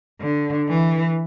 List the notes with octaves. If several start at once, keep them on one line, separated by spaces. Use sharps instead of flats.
D3
E3